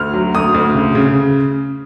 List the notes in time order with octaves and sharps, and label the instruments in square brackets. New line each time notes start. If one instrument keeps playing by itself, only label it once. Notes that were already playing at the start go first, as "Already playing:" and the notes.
Already playing: [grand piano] D2 F6
F#3
D2 D#6
D2
C#3
C#3